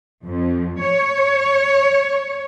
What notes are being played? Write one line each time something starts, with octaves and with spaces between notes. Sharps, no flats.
F2
C#5